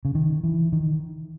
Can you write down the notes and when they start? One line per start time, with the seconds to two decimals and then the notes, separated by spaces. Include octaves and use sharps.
0.05 C#3
0.15 D#3
0.44 E3
0.72 D#3